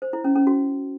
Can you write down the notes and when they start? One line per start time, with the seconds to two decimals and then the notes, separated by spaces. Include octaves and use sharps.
0.02 C5
0.13 E4
0.24 C#4
0.36 C#4
0.47 F#4